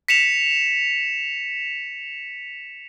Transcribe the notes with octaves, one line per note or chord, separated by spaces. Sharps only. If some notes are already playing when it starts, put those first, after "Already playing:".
B6 C#7 E7 F7